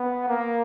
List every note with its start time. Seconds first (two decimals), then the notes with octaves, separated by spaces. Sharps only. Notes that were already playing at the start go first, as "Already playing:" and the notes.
Already playing: B3
0.28 A#3